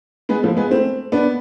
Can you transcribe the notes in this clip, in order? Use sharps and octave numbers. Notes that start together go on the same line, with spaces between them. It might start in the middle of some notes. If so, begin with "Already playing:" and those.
G#3 B3
F3 A3
G#3 B3
A3 C4
B3 D4